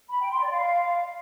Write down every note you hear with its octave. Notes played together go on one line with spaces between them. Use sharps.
B5
G5
C6
D5
F5